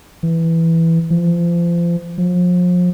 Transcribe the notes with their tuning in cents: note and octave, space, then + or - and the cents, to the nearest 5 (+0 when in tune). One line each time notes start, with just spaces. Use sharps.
E3 +0
F3 -30
F3 +35